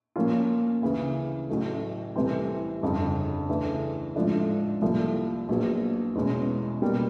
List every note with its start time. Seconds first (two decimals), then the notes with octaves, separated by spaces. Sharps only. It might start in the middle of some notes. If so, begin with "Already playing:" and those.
0.16 A#2 F3 A#3 C#4 F4
0.82 D2 C#3 E3
1.49 A1 A2 F#3 A3
2.16 C2 C3 E3 A3 C4
2.82 G1 F2 C#3
3.49 D2 C#3 E3 A3 D4
4.16 A1 G#2 F3 A3 D4
4.82 C2 A#2 F3 A3
5.49 A#1 A#2 F#3 B3
6.15 E2 B2 G#3 C#4
6.82 B2 G3 A#3